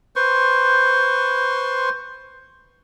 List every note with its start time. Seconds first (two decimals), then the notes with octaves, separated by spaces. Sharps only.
0.16 B4 C5 C6 C#6